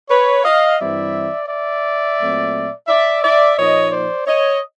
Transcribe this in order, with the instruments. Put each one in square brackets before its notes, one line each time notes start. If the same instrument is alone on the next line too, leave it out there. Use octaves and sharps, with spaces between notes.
[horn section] B4 C#5
D#5 F5
G2 E3 G3 C4 E4 D5 E5
D5 E5
A#2 F#3 A3 C4
D5 E5
D5 E5
A#2 F3 A#3 D#4 C#5 D#5
C5 D5
C#5 D#5